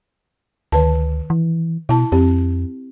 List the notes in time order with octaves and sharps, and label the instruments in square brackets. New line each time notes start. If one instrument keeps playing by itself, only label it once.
[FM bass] D2 [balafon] D#3 B4 A5
[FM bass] E3
[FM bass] B2 [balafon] E4 A5
[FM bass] F2 [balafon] C4 G4